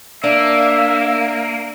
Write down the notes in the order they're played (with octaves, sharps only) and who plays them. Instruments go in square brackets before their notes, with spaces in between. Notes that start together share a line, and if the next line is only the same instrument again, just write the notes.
[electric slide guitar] A#3 [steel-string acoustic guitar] D4 [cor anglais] E5